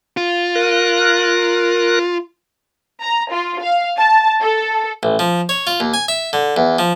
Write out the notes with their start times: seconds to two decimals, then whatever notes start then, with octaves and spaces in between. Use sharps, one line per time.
0.17 F4
0.55 A#4 F#6
3.02 A#5
3.32 F4
3.63 F5
3.98 A5
4.41 A4
5.03 A1
5.19 F3
5.49 C#5
5.67 F4
5.80 D#2
5.94 G#5
6.08 E5
6.33 D3
6.56 E2
6.79 F3